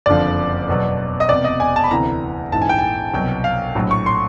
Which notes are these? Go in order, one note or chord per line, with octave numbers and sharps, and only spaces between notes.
F#1 F2 D3 F3 D5
E2 B2 F#3
D#5
E1 E2 C3 D5
D#5
G#5
A5
B5
D2 C3 E3 A#5
A#1 G#2 E3 A5
G#5
G5
G#5
C2 B2 F#3 G5
F5
A#1 A2 F#3
C#6
C6